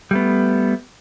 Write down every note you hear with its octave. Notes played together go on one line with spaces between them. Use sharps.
G3 A3 B3